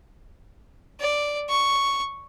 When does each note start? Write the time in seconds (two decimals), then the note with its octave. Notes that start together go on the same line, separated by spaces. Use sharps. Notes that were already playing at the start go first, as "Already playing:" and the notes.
1.01 D5
1.49 C#6